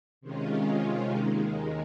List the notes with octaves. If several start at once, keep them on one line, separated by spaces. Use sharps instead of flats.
C3 D#3 G#3 C#4 F4
D#2 D#3 G#3